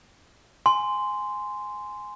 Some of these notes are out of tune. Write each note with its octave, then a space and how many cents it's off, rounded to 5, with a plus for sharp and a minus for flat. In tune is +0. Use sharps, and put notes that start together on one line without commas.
G#5 +0 C6 -10